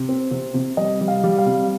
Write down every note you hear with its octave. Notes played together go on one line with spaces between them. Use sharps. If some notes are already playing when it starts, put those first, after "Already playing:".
Already playing: C3
C4
C3
C3
G3 D#5
G3
F5
G3
F5
C3